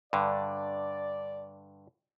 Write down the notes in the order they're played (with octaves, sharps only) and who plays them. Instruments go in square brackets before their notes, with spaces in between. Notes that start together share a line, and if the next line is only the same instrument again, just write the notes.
[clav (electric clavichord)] G2 D3 [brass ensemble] D5